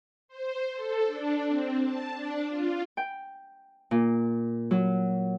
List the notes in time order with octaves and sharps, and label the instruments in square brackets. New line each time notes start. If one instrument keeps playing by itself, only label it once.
[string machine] C5
A4
D4
C4
A5
D4
F4
[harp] G5
A#2
F#3